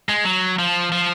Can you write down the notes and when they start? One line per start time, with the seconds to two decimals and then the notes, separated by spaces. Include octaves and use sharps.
0.09 G#3
0.25 F#3
0.59 F3
0.92 F3